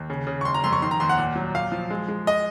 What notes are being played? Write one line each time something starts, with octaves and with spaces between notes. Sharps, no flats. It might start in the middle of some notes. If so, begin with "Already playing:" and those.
Already playing: D#2
C#3
C#3
C#6
F#1 C6
A#5
F2 C6
C#6
D#3 C6
A#5
D#2 C6
F#5
A#2
F#3
A#2 F5
F3
G#3
G#3
D#5